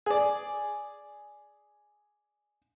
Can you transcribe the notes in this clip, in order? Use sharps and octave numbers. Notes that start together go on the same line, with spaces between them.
G#4 D5